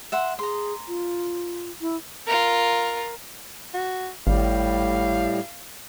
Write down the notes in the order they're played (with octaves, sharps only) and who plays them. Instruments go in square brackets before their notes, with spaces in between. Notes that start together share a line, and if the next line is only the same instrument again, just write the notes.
[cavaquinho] E5 F#5 C6
[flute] G#4 [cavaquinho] A#5 C6
[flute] F4
E4
[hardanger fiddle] F4 A#4
[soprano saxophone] F#4
[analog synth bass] G#1 [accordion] A2 G3 [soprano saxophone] F5